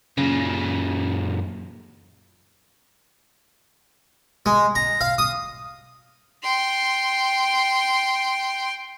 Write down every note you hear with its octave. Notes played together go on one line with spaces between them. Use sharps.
F#2 A#2 C#3
G#3
A#5
F5
D#6
G5 C6